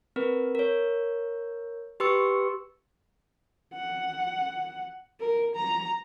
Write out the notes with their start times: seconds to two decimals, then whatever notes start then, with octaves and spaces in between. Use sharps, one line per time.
0.16 C4 A#4 B4
0.55 A#4 C#5
2.00 G4 B4 C6 C#6 E6 C#7
3.74 F#5
5.20 A#4
5.55 A#5